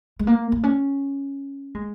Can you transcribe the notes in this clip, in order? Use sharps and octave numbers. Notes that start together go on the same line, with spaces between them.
G#3
A#3
A#3
C#4
G#3